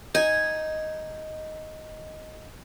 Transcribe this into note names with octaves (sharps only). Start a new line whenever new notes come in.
D#4 G#5